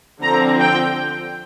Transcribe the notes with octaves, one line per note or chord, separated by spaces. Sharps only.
D3 F3 C4 A#5
G5